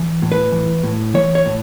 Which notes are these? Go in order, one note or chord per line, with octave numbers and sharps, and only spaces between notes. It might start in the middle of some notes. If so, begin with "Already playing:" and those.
Already playing: E3
A2
B4
E3
A2
E3 C#5
C#5
A2